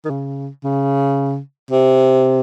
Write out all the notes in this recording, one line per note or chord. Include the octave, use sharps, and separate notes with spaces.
D#3
C#3
C#3
C3